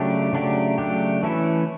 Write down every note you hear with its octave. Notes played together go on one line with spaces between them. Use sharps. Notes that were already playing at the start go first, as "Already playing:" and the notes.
Already playing: C#3 F#3 A3 D4 G4
C#3 F#3 A3 D4 G4
C#3 F#3 A3 D4 G4
E3 A3 C#4 E4 A4